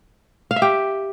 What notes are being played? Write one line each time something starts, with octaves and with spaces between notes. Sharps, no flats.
F5
E5
G4